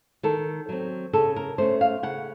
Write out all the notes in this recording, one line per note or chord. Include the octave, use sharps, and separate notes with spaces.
D#3 A4
F#3 C4
C#3 A4
A#4
A3 C#4 C5
F5
C#3 F#5